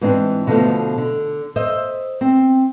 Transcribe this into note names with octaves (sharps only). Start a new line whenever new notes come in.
G#2 E3 C4 D4
B2 D3 F3 A3
D3
C5 D#5 E5
C4